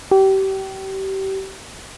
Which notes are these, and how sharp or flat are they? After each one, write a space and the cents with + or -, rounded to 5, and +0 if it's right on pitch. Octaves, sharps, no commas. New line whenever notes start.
G4 -30